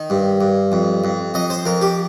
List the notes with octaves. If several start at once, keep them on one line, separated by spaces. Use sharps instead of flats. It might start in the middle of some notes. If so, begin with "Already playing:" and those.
Already playing: D#3
G2
G2
F2
F2
F2 D#5
C5
F2 A#4
G4